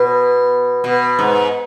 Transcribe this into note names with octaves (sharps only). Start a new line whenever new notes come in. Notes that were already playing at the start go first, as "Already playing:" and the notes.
Already playing: B2
B2
G#2